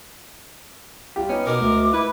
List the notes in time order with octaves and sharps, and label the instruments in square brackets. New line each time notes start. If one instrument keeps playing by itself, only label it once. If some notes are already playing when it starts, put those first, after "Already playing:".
[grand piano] G3 F4 G4
[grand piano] B3 D#4 [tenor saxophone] C#4
[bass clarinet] B2 [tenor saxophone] A#4 [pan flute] D6
[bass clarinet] D2 [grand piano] G#3
[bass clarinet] E4 [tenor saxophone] B4